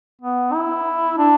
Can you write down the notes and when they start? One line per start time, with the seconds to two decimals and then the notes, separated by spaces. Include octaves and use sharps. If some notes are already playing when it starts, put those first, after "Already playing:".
0.21 B3
0.53 E4
1.18 D4